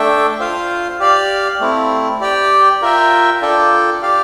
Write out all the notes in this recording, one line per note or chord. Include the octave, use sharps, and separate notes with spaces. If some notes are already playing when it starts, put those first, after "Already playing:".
Already playing: A3 D4 A4 E5 G5
F4 C5 F5
G4 D5 F5
A3 C4 E4
G4 D5 G5
F4 A#4 E5 G5
D4 F4 A4 D5 G5
G4 D5 F5